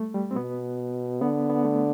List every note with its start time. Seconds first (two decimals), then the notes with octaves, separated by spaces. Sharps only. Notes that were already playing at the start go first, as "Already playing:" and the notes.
Already playing: G3 A3
0.14 G3
0.31 C4
0.36 B2 B3
1.21 D3 B3
1.50 B3
1.65 A3